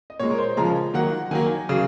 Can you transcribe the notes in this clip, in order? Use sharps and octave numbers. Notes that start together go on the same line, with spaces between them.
D#5
A#2 G#3 C#5
A#4
C5
C#3 F3 G#3 A#5
D#3 F#3 A#3 F#5
D#3 F#3 A#3 G#5
C#3 F#3